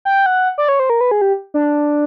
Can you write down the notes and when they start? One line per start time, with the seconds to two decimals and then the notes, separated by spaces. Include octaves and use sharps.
0.05 G5
0.26 F#5
0.58 D5
0.69 C#5
0.80 C5
0.90 A#4
1.01 B4
1.11 G#4
1.21 G4
1.54 D4